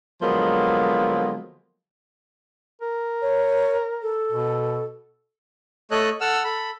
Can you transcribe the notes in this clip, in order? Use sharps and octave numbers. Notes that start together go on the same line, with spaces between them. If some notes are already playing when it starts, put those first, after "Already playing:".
D3 F3 F#3 G#3 A#3 B3
A#4
C#5
A4
B2
A3 A4 C#5 D#5 F#6
A4 F#5 E6 F6
A4 B5